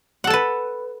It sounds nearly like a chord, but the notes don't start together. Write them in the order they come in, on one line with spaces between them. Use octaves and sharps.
F#5 A4 A5 B4